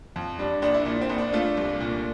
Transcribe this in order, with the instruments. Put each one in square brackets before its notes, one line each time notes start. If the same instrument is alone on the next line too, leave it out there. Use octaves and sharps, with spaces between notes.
[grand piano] F2
G3 D4
A#1 D4
E4
A#2 D4
C4
A#1
D4
A3 D4 F4
C2
A#2